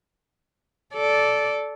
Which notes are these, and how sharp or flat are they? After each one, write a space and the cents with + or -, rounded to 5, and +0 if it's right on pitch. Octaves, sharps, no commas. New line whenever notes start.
A4 -10 D5 -10